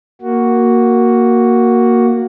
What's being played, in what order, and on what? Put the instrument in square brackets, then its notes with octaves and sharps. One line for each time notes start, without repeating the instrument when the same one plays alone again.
[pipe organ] A#3 F#4